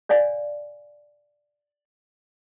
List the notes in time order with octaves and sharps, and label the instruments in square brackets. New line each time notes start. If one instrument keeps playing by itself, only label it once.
[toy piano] C#5 D5 F5 G#5